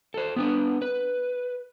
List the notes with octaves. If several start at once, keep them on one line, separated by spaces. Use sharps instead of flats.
A4 C5
B3 D4 B4
B4